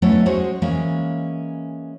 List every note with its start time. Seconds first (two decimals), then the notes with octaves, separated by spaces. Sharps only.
0.02 F#3 A3 B3 C#4 E4 C#5
0.26 G#3 F#4 G#4 C5 C#5
0.62 E3 G#3 A#3 C#4